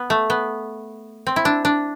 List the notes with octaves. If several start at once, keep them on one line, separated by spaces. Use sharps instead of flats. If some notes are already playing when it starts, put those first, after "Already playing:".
Already playing: B3
A3
B3
C4
E4
D4
D4